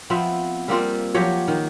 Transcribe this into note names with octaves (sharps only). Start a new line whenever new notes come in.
F3 B3 C4 E5
G3 A#3 C4 F4
F3 F#3 G4 C#5
D#3